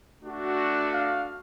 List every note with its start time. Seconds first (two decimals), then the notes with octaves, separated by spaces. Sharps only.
0.23 A3 D4 F#4
0.92 F5